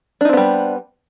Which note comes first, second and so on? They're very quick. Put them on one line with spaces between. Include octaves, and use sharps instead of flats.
D4 D#4 C4 B3 G3